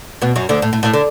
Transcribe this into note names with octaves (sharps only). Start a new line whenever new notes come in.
B2 B3
F#2 F#3
D2 D3
A2
A2
A2
D3